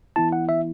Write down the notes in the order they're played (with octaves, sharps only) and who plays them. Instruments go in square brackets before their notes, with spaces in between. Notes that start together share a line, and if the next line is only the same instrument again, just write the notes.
[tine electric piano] E3 B3 E4 A5
F#5
E5